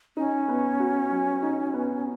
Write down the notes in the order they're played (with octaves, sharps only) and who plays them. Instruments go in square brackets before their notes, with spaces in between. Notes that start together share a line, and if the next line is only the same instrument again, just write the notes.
[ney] C#4 [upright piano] D#4
[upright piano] B3
F#4
F#3
D#4
B3